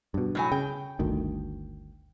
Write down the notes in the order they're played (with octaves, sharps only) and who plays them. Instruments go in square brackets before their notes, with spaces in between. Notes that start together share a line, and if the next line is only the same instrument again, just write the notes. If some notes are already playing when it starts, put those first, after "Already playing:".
[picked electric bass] G2 B2
[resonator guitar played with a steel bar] A2 F#3 G#5
[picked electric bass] C#3 [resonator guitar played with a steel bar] G5
[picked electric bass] G1 D2 D#3